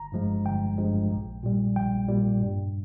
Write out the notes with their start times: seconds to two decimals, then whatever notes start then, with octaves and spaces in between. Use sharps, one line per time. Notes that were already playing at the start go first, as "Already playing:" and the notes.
Already playing: G1 A#5
0.12 G2 F3 G#3
0.45 G1 G5
0.78 G2 F3 G#3
1.11 A#1
1.43 A#2 G3
1.76 A#1 G5
2.09 A#2 G3
2.41 G2